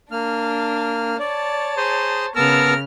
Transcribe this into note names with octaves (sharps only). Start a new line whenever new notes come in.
A#3 D4 F6
C#5 D5 A5
G#4 C5 A#5 D#6
C#3 B3 A#4 A5 E6 F6